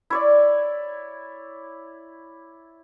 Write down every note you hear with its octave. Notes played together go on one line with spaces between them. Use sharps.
E4 C#5 D5